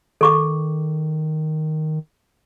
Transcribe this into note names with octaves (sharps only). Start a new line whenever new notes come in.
D#3 A4 C#6 D6